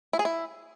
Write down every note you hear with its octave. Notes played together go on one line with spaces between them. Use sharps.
E4
G#4
E4